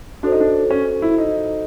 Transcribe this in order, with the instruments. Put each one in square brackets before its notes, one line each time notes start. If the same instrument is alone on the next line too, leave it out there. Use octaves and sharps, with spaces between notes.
[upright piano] D4 [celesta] F#4 A4 C5
[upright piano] D#4
D4
C#4
E4
D#4